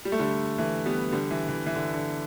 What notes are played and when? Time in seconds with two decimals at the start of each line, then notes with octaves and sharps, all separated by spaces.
0.05 G3
0.12 A3
0.19 D3 G3
0.58 E3 A3
0.86 G3 B3
1.12 D3 G3
1.31 E3
1.49 E3
1.66 E3
1.76 D3
1.94 D3